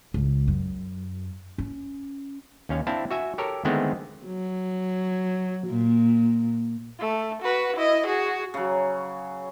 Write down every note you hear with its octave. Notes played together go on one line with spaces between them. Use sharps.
C#2
F#2
C#4
D#2 C#4 F5
C4 D4 E4 F5 A5
F#4 E5 G#5
G4 A4 A#4 C#5
D3 D#3 G#3 A3 B3 C4
F#3
A#2
A3
F#4 B4
E4 D#5
F#4 G#4
C#3 F#3